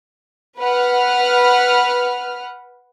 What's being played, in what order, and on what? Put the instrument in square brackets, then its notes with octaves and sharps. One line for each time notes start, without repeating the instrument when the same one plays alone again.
[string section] B4 F#5 F6